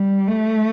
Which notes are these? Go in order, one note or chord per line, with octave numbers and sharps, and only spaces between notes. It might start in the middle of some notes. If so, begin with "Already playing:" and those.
Already playing: G3
A3